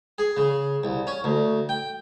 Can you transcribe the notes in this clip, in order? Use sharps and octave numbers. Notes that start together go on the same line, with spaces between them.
G#4
C#3
C2
C#4
D2
G5